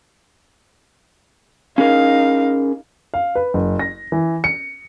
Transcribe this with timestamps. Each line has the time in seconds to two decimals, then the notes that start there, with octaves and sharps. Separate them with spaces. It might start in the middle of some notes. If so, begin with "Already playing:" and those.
1.78 C#4 D#4 G#4 A#4 F5
3.14 F5
3.35 B4
3.54 F#1
3.79 A#6
4.12 E3
4.44 C#7